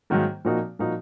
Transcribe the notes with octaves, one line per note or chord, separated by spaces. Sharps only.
G#2 D#3 F#3 A#3
A#2 F3 A#3 D#4 F#4
A#2 F3 A#3 D#4 F#4